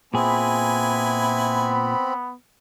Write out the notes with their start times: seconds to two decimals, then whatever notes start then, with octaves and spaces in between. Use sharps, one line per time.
0.14 A#2 B3 C4 E4 G#4 G#5 B5